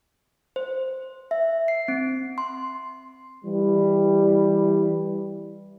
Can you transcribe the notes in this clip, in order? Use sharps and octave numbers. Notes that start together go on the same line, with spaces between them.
C5
E5
C7
C4
C6
E3 G3